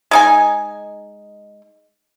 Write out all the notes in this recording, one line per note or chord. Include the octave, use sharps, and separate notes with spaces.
G#3 D#4 G#5